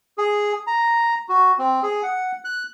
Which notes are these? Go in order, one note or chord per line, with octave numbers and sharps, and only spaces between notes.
G#4
A#5
F#4
C4
G#4
F#5
F#6